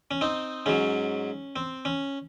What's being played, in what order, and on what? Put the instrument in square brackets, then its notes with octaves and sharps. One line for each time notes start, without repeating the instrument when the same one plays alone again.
[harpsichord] C#4
C4 D#4
G#2 F#3 C#4
C4
C#4